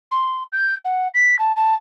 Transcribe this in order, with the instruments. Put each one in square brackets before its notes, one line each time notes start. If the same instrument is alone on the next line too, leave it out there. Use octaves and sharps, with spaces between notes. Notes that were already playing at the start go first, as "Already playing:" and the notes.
[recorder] C6
G6
F#5
B6
A5
A5